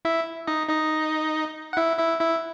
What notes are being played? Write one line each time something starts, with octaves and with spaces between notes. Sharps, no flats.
E4 E5
D#4 D#5
D#4 D#5
F#5
E4 E5
E4 E5
E4 E5